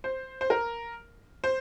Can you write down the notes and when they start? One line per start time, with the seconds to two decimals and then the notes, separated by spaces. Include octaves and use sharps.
0.04 C5
0.41 C5
0.50 A#4
1.44 C5